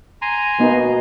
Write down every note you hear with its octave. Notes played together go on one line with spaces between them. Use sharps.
G#5 A#5 C6
B2 A#3 B3 D#4